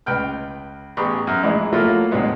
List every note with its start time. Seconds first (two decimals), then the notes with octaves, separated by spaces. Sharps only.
0.06 C#2 B4 G5 F6
0.97 A1 B3 G4 G#4 B5 C#6
1.27 F#2 F6
1.43 A#1 E3 G#3 E4
1.72 F3 F#3 A3 A#3 E4 F4
2.11 D2 A2 F#3 G#3 B3